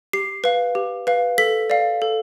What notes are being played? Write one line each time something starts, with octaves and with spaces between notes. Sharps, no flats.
G4 C7
B4 F5
G4
B4 F5
A4 B6
D5 F5
A4